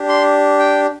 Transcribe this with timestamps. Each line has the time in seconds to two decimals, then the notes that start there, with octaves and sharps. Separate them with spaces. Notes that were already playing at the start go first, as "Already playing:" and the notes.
Already playing: D4 G4
0.09 C6
0.59 G5